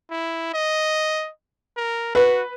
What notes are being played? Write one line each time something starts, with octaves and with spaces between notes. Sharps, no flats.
E4
D#5
A#4
F#4 B4